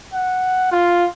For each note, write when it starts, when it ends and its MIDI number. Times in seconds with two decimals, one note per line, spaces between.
0.14 0.69 78
0.71 1.05 65